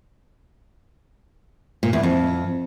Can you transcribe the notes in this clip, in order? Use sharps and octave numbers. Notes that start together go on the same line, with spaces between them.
A#2
E2
F2